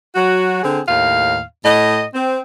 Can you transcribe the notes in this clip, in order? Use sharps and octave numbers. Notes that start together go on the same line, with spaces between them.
F#3 F#4
D3 C4 G#4
D#2 A2 F5
A2 D#5
C4